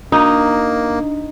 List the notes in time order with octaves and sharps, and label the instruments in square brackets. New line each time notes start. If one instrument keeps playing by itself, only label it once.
[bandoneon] A#3 [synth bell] D4 [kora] D#4